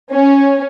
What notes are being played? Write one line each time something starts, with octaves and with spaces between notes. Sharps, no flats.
C#4